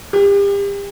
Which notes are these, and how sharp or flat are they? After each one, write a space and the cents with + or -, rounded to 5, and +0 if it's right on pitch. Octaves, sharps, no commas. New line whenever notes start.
G4 +35